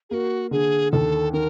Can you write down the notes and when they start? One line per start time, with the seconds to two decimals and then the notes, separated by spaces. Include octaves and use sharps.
0.10 A#3 F#4 G#4
0.51 D3 G#4
0.92 D#2 A4
1.33 D#3 A#4